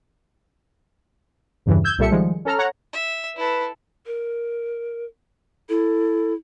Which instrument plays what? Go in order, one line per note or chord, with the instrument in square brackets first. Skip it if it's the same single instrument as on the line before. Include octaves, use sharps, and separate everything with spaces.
[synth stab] E2 G2 C#3 E3
E6 G6 G#6
C2 A#2 G3 A4 E5 C#7
D#3 F3 G3 G#3
C#4 A4 A#5 F6
C#5 F#5 A#5
[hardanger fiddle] E5
[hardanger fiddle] E4 A4 [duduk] B4
[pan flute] A#4
[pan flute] E4 [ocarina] A4